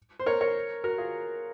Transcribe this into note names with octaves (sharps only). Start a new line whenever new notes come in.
C5
A#4 C#5
A#4 C#5
F#4 A#4
F4 G#4